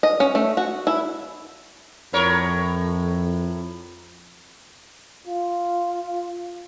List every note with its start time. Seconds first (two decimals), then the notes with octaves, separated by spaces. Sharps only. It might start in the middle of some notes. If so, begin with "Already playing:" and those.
0.03 D#5
0.20 C#4
0.35 A3
0.57 F#4
0.87 E4
2.13 F2 A2 A#4 C#5
5.27 F4